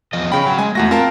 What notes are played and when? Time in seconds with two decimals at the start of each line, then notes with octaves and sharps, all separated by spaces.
0.13 E2 F3 D#5
0.32 C#3 G5 B5
0.46 F#3
0.58 G#3 G#5
0.75 E2 A3 F#4 A#6
0.91 C4 F4 A#4 A5